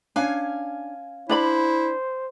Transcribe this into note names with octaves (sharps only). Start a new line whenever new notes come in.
C#4 D4 F5 G#5
D4 E4 C5 D5 B5